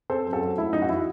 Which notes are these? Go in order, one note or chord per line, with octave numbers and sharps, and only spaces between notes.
C4 A4 C5
F#2
F#4 A4
F#3
A3 E4
F#2 D#4
F#4
E3 E4